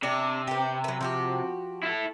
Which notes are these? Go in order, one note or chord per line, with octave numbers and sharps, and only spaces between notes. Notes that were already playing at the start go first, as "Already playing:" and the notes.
C3 D4
G4 B4
F#3 B4
F3 F#4 G4
E4 A4